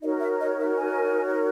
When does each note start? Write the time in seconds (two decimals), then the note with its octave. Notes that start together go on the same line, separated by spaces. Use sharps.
0.01 D#4 F#4 A#4 C#5 D#5
0.20 E5
0.39 D#5
0.58 E5
0.77 G#5